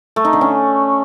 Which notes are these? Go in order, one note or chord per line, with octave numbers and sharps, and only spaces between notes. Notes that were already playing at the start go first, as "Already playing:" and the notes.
A3
D#4
D3
C#4